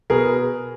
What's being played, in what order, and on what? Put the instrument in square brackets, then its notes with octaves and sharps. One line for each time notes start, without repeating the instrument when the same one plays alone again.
[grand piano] B2 G#4 A#4